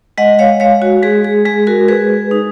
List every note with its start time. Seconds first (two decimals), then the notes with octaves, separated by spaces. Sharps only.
0.18 G#3 D#5 F#5
0.39 C#5 F5
0.60 G#3 C#5 F5
0.82 F#4
1.03 G#3 G#4
1.24 G#4
1.45 G#3 G#4
1.67 F#4 A#4
1.88 G#3 G#4 B4
2.31 D#4